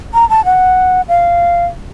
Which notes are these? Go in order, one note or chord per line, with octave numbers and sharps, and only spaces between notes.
A#5
A5
F#5
F5